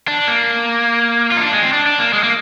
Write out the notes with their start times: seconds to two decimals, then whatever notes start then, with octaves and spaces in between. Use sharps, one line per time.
0.08 D4
0.28 A#3
1.32 F4
1.37 D#4
1.41 D4
1.52 G#3
1.62 C4
1.73 D4
1.86 D4
2.00 A#3
2.13 G#3
2.24 A#3